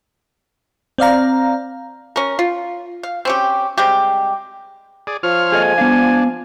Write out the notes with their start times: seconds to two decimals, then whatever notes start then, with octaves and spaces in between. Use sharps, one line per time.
0.98 C4 D5 F5 A#5
2.16 C#4 A#4
2.39 F4
3.03 F5
3.25 C4 C#4 G4
3.78 C3 G3 G#3 G4
5.07 G#4 D5
5.23 F3 F4 C#5 F6
5.52 G#4 A4 D#5 G#5
5.78 B3 D4 F5